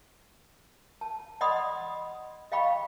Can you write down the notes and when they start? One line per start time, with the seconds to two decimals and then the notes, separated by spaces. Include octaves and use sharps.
1.01 A5
1.41 D5 D#5 F#5 B5 C6 D#6
2.52 D#5 F5 G5 B5 C#6